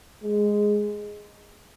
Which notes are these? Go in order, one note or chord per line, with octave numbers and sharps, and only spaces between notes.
G#3